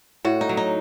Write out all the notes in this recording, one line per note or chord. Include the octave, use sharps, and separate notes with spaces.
A2 F#4
D#4
F#3
D#4